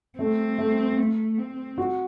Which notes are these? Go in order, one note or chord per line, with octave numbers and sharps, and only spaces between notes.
A3 C4 A4
A3 A4
A3
C4
F#4